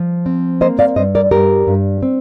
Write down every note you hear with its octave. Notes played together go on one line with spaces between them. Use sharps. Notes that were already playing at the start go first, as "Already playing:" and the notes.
Already playing: F3
C4
A#3 C5 D#5
D5 F5
G2 C5 D#5
A#4 D5
G2 G4 A#4
G2
C4